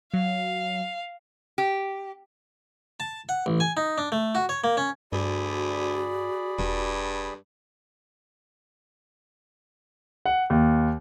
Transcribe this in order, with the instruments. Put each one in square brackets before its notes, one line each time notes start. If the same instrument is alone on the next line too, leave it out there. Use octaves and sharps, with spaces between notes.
[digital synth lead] F#3 [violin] F5
[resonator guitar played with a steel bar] G4
[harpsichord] A5
F#5
A1
G#5
D#4
D4
A3
F#4
C#5
A#3
C#4
[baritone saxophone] D2 [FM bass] G2 [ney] F#4 [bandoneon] G#4 D5 B5
[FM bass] E1 [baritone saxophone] G2
[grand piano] F#5
D#2